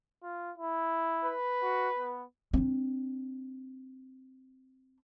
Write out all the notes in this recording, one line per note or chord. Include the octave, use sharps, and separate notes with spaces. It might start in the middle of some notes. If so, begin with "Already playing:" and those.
F4
E4
B4
F#4
B3
C4 D4